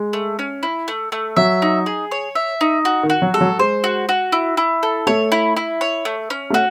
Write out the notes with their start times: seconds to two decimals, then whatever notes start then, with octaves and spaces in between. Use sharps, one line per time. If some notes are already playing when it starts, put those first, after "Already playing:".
Already playing: G#3
0.13 A3
0.39 C#4
0.63 E4
0.88 A3
1.12 A3
1.36 F#3 E5
1.62 D#4
1.86 G#4
2.11 C#5
2.35 E5
2.61 D#4
2.85 F#4
3.03 D#3
3.10 F#4
3.22 F#3
3.34 G#3 A4
3.41 F#3
3.59 G#3 C5
3.84 F#4
4.09 F#4
4.32 E4
4.57 E4
4.83 A4
5.07 A3 C#5
5.32 E4
5.57 E4
5.81 C#5
6.05 A3
6.30 C#4
6.50 A3
6.54 F#4